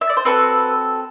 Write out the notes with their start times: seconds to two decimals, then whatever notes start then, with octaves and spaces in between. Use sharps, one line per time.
0.01 E5
0.09 D5
0.17 C5
0.25 C4 F#4 A4 B4